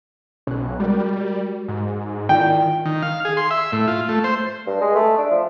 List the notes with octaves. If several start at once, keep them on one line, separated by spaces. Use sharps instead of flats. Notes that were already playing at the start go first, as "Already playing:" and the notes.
B1 C#4 F#6
G3 G#3 F#4 A#4
G#2
D#3 E4 F4 D5 G5
D#3
F5
G#4
C6
E5
A2
F4
A3
C5
G2
G#3
A3
D4
F3